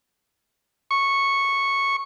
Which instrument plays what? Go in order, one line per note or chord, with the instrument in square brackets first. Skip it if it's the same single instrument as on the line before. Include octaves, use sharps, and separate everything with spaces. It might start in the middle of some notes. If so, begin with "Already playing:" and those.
[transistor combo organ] C#6